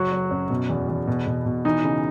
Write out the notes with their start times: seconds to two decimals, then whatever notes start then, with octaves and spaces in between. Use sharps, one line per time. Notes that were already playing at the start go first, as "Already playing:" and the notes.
Already playing: F#1 F#3 F#4
0.12 F#3
0.31 F#2
0.50 B2
0.70 E2
0.88 E2
1.07 B2
1.27 B2
1.46 B2
1.65 E3 D#4
1.84 C#3